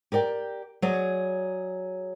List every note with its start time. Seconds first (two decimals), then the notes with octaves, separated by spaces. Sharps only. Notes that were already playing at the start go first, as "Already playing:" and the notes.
0.12 G4 A#4 D5 G5
0.82 F#3 G#4 C#5 D5